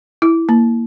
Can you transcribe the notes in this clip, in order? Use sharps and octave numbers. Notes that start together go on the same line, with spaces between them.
E4
A#3